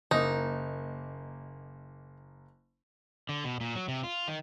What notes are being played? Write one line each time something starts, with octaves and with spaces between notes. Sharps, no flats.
F#1 A#3 D#4
D3
B2
A#2
F#3
C3
F4
D#3